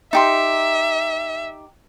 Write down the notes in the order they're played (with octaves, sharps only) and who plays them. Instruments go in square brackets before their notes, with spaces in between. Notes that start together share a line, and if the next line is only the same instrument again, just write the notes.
[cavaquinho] D#4 G4 C6 [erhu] E5